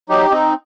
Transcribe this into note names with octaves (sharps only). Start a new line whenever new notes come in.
F#3 D#4 G4
C4 D#4